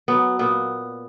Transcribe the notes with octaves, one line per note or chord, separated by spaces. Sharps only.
F#3 B3
A#2 B3